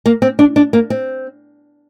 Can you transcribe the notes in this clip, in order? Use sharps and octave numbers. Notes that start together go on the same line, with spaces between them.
A#3
C4
D4
D4
A#3
C4